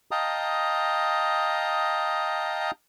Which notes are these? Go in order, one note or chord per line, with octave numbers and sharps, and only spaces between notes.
D#5 F5 G5 A5 A#5 D#6